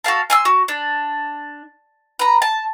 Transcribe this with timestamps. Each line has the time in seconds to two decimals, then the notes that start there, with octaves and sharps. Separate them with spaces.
0.04 F#4 A4 F5 A5
0.30 G#5 C6 E6
0.45 F#4
0.68 D4
2.19 B4 A#5
2.42 A5